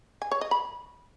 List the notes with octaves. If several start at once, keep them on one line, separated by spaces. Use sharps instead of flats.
G#5
C#5
D#5
B5